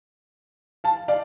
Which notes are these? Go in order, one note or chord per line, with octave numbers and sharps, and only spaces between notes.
F5 A5
D5 F5